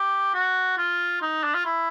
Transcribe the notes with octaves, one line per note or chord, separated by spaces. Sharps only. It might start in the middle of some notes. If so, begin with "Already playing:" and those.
Already playing: G4
F#4
F4
D#4
D4
F4
E4